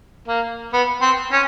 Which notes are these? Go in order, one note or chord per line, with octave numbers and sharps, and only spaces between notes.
A#3
B3
C4
C#4